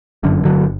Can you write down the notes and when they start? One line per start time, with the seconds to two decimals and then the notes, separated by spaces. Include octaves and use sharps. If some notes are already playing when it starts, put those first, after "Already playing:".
0.23 G1 F#2 D3
0.45 D3 F#3